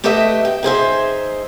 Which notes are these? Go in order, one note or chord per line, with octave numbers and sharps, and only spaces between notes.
A3 G4 B4 D#5 E5
G5
D#4 G#4 C5 E5